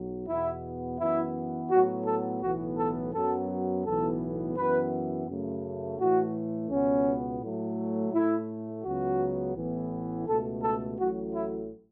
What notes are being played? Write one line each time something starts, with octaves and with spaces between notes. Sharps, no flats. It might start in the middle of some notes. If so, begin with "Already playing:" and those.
Already playing: B1 F#3
E2 B2 B3 E4
F#2 E3 B3 E4
A2 F#3 B3 F#4
A4
B1 A2 E3 B3 F#4
A4
F#2 F#3 B3 A4
B1 A2 E3 B3 A4
F#2 E3 B3 B4
F#2 C#3 A3
A2 E3 A3 F#4
C#2 B2 B3 C#4
A2 F#3 A3
A2 A3 E4
C#2 C#3 F#3 B3 F#4
A1 A2 E3 B3
C#2 B2 A3 A4
A4
A1 A2 F#3 A3 F#4
E4